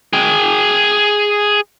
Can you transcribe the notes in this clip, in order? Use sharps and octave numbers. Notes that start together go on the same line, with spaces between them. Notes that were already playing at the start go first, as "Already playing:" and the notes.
G#4 G5